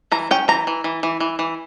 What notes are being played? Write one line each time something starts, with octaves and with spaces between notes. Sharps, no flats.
E3 A#5
C#4 G5
E3 A#5
E3
E3
E3
E3
E3